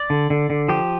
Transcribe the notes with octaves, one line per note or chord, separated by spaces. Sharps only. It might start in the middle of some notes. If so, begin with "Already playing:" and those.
Already playing: D5
D3
D3
D3
F3 G4